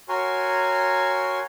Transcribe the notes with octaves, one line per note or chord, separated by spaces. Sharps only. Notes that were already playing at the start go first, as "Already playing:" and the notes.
F#4 A#4 C#5 G#5 C6